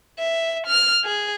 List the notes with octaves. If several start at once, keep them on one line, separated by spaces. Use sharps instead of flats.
E5
F6
G#4